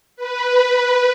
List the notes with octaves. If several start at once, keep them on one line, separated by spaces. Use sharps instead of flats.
B4